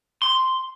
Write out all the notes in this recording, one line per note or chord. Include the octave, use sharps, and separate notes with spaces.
C6